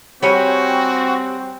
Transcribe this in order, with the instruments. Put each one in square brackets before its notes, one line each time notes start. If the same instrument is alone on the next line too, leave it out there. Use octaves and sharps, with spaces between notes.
[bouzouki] G3 C#5 G#5 [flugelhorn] C4 [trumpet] F#4